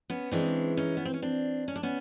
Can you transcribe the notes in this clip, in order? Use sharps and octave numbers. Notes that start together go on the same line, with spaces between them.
B3 C#4
C#3 E3 G#3 C4 D4
C#4 D#4
B3
C4
C#4
C4 D4
C#4
D4
B3 C#4